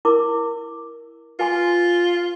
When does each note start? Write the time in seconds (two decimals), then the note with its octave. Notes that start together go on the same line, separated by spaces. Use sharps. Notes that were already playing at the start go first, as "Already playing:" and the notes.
0.05 E4 A#4 D6
1.39 F4 B4 G#5 C6